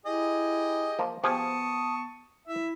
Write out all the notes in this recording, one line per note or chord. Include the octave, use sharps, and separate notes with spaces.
E4 G4 G#4 D#5
F3 A#3
F3 B3 G4 G#4 A5 C#6 D#6
E4 E5